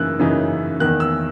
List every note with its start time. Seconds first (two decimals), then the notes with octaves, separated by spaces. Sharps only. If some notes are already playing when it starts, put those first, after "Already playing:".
Already playing: F#2 C#3 E3 A#3 D#4 E6 F#6
0.19 F#2 C#3 E3 A#3 D#4
0.80 E2 D#3 A#3 F#6
1.00 E6